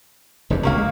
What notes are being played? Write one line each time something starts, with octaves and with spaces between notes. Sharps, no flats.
F1 E2 G2
C#2 G2 A#3 C#4 F5
G#3